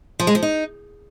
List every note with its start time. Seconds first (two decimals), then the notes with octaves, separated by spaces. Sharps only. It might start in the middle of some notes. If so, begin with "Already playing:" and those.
0.20 F3
0.27 G#3
0.35 F3
0.43 D#4